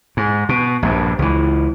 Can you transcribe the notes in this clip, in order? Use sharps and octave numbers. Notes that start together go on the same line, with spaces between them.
G#2
B2
A#1 G2
C#2 E3